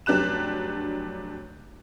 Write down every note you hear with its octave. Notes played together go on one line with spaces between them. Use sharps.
F1 F#3 D4 G4 F#6 E7